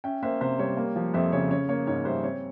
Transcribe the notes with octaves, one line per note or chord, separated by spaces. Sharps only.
C#4 E5 G5
A#3 C5 E5
C3 C5 E5
G3 C#5
A#3
F3
F2 C5 E5
C#3 C#5
C#4 C#5
A#3 C#5
G#2 C#5
G3 C5 E5
C4 C#5